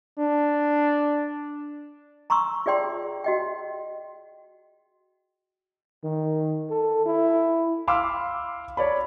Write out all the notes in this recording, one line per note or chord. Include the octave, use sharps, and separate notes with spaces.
D4
A#5 C6 C#6 E6
F4 G#4 D5 G5 C6
F#4 D#5 G5
D#3
A4
E4
F5 B5 C6 D6 E6 F6
C#5 D5 B5